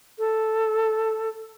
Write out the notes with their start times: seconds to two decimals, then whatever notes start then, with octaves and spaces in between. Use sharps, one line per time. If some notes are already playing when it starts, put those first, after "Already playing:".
0.19 A4